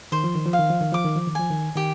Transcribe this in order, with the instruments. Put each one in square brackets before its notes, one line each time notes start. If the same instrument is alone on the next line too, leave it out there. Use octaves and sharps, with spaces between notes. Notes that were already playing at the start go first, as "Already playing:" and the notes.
[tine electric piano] D#3 [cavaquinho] C5
[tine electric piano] F3
D#3
F3
[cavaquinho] F5
[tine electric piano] D#3
F3
D#3
[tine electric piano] F3 [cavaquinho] D6
[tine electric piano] D#3
F3
D#3
[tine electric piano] F3 [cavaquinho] G#5
[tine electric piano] D#3
[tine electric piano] D#3 [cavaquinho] G4